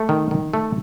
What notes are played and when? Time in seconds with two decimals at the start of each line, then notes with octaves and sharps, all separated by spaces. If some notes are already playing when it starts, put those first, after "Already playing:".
Already playing: A3
0.09 D#3
0.31 D#3
0.54 A3